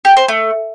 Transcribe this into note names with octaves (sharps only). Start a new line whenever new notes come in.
G4
C5
A3